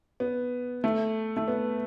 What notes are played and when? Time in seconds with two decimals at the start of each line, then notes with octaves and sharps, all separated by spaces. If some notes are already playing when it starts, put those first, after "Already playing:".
0.20 B3
0.84 A3
1.37 A3
1.48 B3